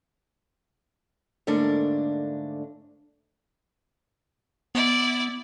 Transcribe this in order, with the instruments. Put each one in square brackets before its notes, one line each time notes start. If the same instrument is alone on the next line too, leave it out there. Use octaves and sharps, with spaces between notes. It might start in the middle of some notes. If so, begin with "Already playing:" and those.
[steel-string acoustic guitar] G#2 D3 A3 A#3 D4
[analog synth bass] B3 [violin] E4 D5